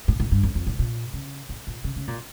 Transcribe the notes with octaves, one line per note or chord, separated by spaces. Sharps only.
A2
A2
G2
F2
F2
A2
A#2
C#3
A2
A#2
C#3
C#3
A#2